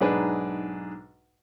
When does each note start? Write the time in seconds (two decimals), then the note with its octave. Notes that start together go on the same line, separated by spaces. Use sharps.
0.01 B1 G#2 D4 G#4 B4